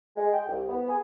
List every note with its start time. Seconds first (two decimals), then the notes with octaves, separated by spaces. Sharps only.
0.17 G#3
0.33 G5
0.48 C2
0.68 B3
0.89 G#4